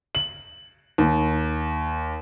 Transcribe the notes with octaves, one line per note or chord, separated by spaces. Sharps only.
F#7
D#2